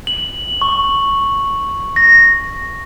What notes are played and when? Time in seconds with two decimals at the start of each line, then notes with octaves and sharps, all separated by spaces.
0.07 F#7
0.62 C#6
1.96 A#6